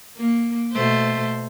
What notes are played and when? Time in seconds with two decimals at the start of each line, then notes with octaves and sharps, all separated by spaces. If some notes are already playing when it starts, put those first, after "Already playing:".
0.17 A#3
0.72 B2 A3 C5